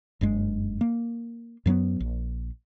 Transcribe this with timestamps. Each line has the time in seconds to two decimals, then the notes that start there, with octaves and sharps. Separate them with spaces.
0.21 F#1 G2 G#3
0.81 A#3
1.66 F#2 F#3 A3 B3
2.00 A#1